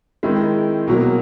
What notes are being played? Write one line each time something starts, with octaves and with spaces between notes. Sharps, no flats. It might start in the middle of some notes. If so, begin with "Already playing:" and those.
D#3 G#3 C4 E4
B2 F#3 A#3